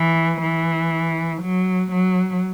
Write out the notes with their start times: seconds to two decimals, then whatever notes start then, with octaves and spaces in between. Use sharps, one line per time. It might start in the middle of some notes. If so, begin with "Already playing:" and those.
Already playing: E3
0.42 E3
1.41 F#3
1.92 F#3